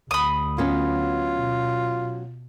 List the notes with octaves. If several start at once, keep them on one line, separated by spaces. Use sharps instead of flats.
D2 B5 D#6
F#3 B3 C#4 F4
B2